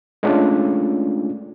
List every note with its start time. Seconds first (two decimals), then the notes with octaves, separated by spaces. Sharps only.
0.23 G#3 A3 C#4 D4 F4